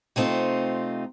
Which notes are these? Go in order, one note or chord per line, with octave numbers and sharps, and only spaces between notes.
C3 A3 C4 D#4 F4